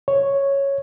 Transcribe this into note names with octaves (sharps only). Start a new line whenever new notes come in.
C#5